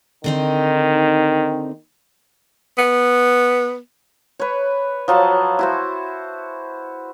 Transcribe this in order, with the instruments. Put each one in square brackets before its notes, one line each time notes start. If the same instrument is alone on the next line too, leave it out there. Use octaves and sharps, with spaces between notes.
[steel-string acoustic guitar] D3 C4 D#4 [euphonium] D#3
[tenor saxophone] B3
[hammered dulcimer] B4 C#5
F3 F#3 A5
E4 F#4 C5